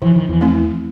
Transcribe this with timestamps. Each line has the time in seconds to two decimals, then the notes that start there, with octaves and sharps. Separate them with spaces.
0.02 E3 F3
0.16 D#3
0.29 E2 E3
0.41 A3 C4 E4